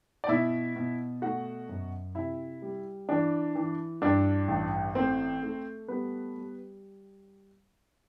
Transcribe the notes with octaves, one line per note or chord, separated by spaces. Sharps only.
D5
B2 E4 E5
B2
A3 F#4 F#5
F#2
C3 E4 E5
G3
E3 D4 D5
E3
G2 D4 D5
A1
A3 C4 C5
A3
G3 B3 B4
G3